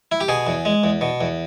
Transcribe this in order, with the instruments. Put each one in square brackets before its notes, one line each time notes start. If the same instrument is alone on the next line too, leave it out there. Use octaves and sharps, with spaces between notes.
[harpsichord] E4
G4
B2 G#4
E2
G#3
E2
B2
E2